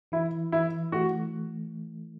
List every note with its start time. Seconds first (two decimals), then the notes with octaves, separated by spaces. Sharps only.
0.12 E3 E4
0.52 E3 E4
0.92 A3 F#4